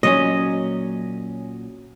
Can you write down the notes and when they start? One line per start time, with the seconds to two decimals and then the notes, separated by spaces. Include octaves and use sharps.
0.03 A#2 F#3 C#4 D#5